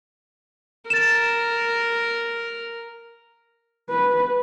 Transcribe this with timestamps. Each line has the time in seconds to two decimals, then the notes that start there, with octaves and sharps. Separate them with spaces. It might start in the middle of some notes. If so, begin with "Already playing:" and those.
0.90 A#4 A6 E7
3.90 B4